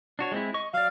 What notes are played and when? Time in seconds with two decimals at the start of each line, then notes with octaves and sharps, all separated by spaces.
0.19 D4 F#4 C#5
0.32 G#3 C4 E4
0.54 D#5 C#6
0.74 F#3 D5 F5